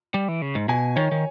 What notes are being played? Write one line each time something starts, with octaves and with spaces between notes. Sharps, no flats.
G3
E3
C#3
G#2
B2 G#5
D#3 C#5
D#3